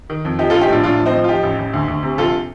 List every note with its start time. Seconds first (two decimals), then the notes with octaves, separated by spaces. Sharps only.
0.10 D#3
0.25 F2
0.39 F3 D#4 G4
0.50 F4 A4
0.54 A#1
0.61 D#4 G4
0.69 A2 D4 F4
0.83 A2 D4 F4
0.99 F3
1.06 C4 D#4
1.13 F3
1.24 F4
1.28 F3 D#4 G4
1.43 A1
1.59 A1
1.73 D2
1.88 D2
2.03 C3
2.18 A#1 F4 A4